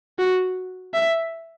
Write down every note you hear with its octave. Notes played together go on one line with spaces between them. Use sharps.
F#4
E5